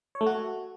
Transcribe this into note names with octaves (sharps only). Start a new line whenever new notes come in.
C#5
A3
F#4